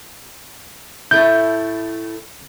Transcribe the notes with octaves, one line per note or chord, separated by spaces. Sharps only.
A2 A3 E4 G6